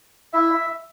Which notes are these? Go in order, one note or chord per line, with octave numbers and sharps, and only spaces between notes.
E4 E5